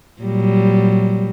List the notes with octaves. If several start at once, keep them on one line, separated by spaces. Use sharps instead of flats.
A#2 F#3 G3